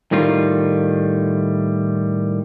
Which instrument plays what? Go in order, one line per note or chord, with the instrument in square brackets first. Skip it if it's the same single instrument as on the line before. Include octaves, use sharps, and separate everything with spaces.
[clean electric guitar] A2 D#3 G3 F4